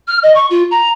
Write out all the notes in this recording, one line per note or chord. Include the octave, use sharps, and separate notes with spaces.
F6
D#5
C#6
F4
A#5